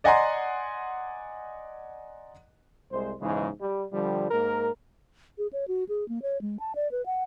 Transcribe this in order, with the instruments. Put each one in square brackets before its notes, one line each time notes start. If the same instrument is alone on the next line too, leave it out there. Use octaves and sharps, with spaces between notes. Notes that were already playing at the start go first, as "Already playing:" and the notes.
[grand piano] D5 D#5 F#5 G#5 A#5 C6
[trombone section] C2 G#3 C5
B1 G#2 C#3 E3 G#3
G3
D3 F3 G3
G#2 A#3 A#4
[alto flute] G#4
C#5
F#4
G#4
A#3
C#5
G#3
A5
D5
B4
F#5